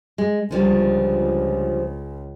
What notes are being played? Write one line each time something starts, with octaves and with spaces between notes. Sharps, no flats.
G#3
C#2 D3 F3 G3